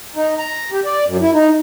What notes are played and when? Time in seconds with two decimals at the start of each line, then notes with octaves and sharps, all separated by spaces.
0.16 D#4
0.38 A#5
0.72 G4
0.85 D5
1.07 F#2
1.21 E4
1.33 D#4